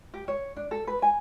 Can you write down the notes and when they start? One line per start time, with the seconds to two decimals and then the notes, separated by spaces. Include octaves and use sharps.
0.14 G4
0.28 C#5
0.56 D4
0.71 A4
0.87 B4
1.02 G#5